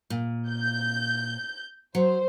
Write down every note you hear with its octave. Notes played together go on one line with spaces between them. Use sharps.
A#2
G6
F#3 C5